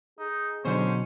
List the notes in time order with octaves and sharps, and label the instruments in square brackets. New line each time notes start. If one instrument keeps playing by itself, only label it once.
[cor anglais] D#4 [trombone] G#4
[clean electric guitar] B2 F#3 [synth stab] D3 C5 [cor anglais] C#4